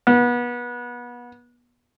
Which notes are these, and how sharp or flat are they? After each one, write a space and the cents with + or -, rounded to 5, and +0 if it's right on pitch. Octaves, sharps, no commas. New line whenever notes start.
B3 -25